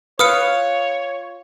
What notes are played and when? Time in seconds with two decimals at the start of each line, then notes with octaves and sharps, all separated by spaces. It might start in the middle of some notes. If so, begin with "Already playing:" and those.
0.19 F4 B4 C#5 D#6 F6 C#7